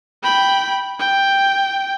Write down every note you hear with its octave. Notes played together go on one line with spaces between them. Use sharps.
G5 B5
G5